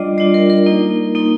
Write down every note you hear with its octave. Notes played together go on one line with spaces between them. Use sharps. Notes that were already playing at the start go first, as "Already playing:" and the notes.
Already playing: G3 D4 F4 D5 D#5
G3 D4 F4 D5
A#4
A#4
A#3 D#4
A#3 D#4